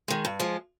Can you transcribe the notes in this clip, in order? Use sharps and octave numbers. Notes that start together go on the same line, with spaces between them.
D#3 G#3
G2
F3 G#3